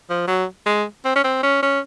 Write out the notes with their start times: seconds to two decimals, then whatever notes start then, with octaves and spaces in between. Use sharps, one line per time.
0.10 F3
0.28 F#3
0.66 G#3
1.05 C4
1.15 C#4
1.24 C4
1.43 C#4
1.62 C#4